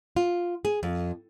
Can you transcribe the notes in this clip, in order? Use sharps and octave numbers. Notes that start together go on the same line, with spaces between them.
F4
G#4
F2